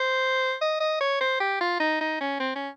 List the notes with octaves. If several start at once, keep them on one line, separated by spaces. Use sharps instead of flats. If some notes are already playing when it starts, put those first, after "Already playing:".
Already playing: C5
D#5
D#5
C#5
C5
G4
F4
D#4
D#4
C#4
C4
C#4